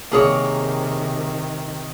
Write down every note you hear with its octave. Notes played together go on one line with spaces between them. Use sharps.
C3 D#3 A#3 G#4 C#5